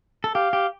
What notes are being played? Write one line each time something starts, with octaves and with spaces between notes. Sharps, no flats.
A4
G4 F5
G4